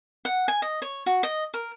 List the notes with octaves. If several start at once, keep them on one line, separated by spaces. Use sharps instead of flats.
F#5
G#5
D#5
C#5
F#4
D#5
A#4